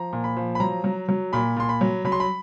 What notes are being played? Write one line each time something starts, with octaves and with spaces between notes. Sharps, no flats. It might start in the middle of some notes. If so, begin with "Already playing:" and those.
Already playing: F3 A#5
A#2
B5
F3
B5
F#3 A#5
F#3
F#3
A#2 B5
A#2 C6
B5
F#3
F#3 B5
C6
B5